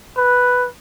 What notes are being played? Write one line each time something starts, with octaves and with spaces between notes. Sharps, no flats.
B4